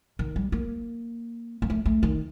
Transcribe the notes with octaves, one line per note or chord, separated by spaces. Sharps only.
D#3
G3
A#3
A#3
A3
A3
D#3